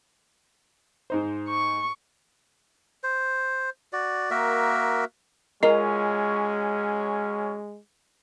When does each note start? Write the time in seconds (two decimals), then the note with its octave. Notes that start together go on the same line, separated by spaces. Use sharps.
1.10 G#2 D#4 C5
1.48 C#6
3.04 C5
3.93 F#4 D5
4.31 A#3 F#4 A#4 E5
5.63 F#3 G#3 C#4 F4 A#4 D#5